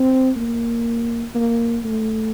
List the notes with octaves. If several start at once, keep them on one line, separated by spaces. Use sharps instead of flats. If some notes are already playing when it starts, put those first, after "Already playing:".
Already playing: C4
A#3
A#3
A3